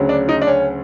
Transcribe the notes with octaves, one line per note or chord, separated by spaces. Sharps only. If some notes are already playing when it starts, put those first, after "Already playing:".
Already playing: D2 C#3 F#3
D4
D#4
D4
C#4